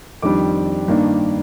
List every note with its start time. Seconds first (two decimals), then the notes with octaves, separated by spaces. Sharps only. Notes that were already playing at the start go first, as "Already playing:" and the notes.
0.22 F2 D#3 G3 D4 D6
0.88 G2 D#3 A#3 D4